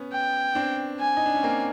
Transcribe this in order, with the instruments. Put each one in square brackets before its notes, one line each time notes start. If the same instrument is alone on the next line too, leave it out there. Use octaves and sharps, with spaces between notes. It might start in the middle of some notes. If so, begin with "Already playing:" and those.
Already playing: [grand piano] B3 C#4
[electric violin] G5
[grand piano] C4 D4
[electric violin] G#5
[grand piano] D#4
D4
C#4
A#3 C4